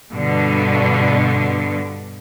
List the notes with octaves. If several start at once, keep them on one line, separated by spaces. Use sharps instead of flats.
G2 B2 D3